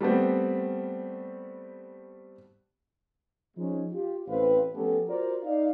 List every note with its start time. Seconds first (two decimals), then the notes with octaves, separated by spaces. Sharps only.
0.01 G3 A3 B3 C4
3.57 F3 G#3 C#4 D#4
3.92 F4 G4
4.28 A1 C4 B4 F5
4.75 F3 A3 B3 C#4 G4 A4
5.08 F4 F#4 A#4 C5 D5
5.43 D#4 D5 F5